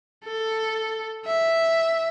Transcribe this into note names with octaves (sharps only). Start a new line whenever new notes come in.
A4
E5